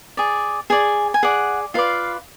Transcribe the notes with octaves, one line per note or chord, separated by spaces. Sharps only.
G#4 D5
G#4 D5 G#5
G#5
G#4 D5 F#5
F4 B4 D5 F5